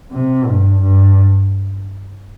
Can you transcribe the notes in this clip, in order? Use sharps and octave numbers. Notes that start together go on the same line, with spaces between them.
C3
G2
G2